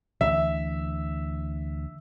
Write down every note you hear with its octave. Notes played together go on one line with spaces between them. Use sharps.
D2 E3 E5